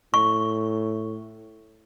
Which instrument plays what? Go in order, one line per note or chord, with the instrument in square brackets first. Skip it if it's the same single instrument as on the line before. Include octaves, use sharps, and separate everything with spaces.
[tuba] A2 [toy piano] C#6